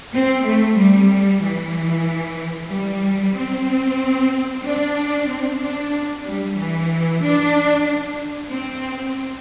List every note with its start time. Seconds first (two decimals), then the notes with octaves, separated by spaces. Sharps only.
0.13 C4
0.45 A3
0.78 G3
1.42 E3
2.70 G3
3.35 C4
4.64 D4
5.29 C4
5.60 D4
6.25 G3
6.57 E3
7.22 D4
8.50 C4